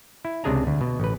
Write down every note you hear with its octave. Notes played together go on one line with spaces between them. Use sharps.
E4
C#2 C3 D4 G#4 G#5 A#5
D2
B2
A1 B4